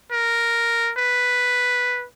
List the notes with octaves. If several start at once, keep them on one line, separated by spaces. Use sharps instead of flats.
A#4
B4